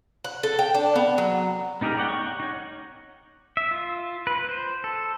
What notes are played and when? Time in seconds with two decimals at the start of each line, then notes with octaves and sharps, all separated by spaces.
0.24 F#5
0.43 A4
0.59 G5
0.75 D4
0.96 B3
1.18 F#3
1.81 B3 D#4 G4 G#4 A#4
1.97 C#5 D5 F#5 G5
2.09 C#6
2.27 F#5
2.40 D#4 C#5
3.57 E5
3.71 F4
4.27 B4
4.49 C5
4.84 A4